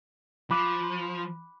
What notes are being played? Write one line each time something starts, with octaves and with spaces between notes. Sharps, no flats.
F3 B5 D6 F#6